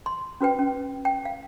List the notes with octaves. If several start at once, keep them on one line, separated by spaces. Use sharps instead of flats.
C6
C#4 F#4 B4 G5
C#4
G5
F5